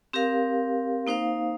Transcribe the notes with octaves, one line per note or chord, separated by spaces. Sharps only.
C4 G4 A#4 F5
A#3 D#4 C5 F5